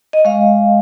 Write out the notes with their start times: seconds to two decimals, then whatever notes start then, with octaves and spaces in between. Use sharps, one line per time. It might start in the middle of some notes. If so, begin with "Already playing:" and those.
0.13 D#5
0.25 G#3 F5